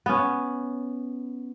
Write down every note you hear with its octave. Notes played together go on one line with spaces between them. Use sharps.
B3 C#4